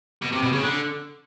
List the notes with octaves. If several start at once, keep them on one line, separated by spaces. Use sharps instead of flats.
B2
C3
B2
C#3
D3